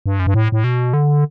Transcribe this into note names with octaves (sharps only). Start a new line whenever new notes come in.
G2
F#2
G2
A2
A2
B2
D3